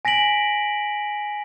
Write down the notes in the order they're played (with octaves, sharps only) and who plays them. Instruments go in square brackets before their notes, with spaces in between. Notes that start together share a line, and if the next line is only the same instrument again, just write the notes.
[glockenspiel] G#5 A#6 B6 D7 F#7